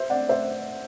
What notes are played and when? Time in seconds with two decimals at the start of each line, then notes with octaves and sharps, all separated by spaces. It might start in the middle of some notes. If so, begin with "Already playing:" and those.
Already playing: C5 E5
0.10 D5 F#5
0.29 C5 E5